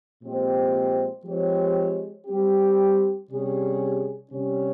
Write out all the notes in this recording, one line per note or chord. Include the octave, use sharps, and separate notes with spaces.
A#2 F3 G#3 C4 G4
F3 G#3 C4 G4 C#5
G3 C4 G4
C3 G3 C#4 G#4
C3 G3 C#4